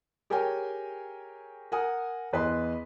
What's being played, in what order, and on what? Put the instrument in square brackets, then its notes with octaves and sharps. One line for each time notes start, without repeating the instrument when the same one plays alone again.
[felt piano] G4 G#4 A#4 C#5 G5 G#5
A#4 F#5 G#5 D#6
E2 B4 D#5 C6